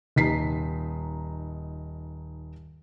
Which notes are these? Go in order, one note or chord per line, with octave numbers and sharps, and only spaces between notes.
D#1 D#4 B6 C7